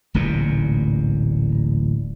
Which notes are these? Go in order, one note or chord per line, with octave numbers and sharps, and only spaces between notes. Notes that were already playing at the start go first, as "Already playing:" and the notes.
D1 A1 G2 A#2